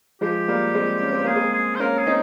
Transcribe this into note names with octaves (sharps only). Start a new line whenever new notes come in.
F3 G#3 G4
G3 A#3
G#3 C4
C#4
C4
A#3 G#4
G#3 C4
G#4
C5
A#3 C#4 A#4
G#4
C4 D#4